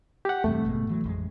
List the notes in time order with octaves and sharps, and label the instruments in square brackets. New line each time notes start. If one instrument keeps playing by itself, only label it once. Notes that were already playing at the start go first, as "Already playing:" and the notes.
[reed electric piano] G4 F#5
[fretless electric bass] E2 G2 C3 [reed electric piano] A3
[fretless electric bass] G1 B2 G#3
A2 E3 F#3
A1 F2 G#3